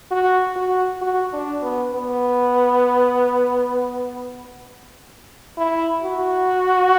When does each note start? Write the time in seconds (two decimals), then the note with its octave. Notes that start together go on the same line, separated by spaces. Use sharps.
0.11 F#4
0.56 F#4
1.02 F#4
1.33 D4
1.63 B3
1.94 B3
5.58 E4
6.03 F#4